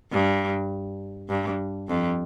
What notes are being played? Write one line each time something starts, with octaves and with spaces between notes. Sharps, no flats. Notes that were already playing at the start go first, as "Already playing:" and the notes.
G2
G2
F2